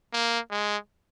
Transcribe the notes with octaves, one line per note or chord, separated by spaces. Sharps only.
A#3
G#3